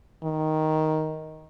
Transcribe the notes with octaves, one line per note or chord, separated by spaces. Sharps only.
D#3